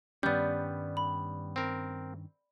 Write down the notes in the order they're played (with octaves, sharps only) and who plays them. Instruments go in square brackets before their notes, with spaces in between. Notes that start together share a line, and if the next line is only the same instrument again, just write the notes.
[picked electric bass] G2 D#3 C#4 [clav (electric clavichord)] G3 B3 [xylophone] D5 G6
[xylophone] B5
[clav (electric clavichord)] C4 A#4